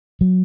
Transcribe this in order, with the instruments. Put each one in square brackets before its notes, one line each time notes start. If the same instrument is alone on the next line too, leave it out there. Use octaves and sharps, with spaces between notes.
[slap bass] F#3